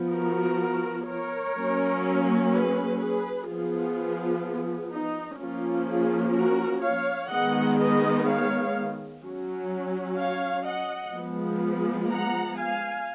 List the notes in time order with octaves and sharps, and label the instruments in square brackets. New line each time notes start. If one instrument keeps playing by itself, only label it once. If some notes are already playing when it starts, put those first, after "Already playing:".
Already playing: [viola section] F3 B3
F#4 A#4
A#4 C#5
F#3 A#3 C#4
G#4 B4
G#4 B4
F3 B3 F4 G#4
D#4
F3 A#3 C#4 F4
F4 G#4
F#4 A#4
C#5 F5
D#3 G#3 B3 D#5 F#5
B4 D#5
C#5 F5
F#3 C#4
C#5 F5
D#5 F#5
F3 G#3 B3
F#5 A#5
F5 G#5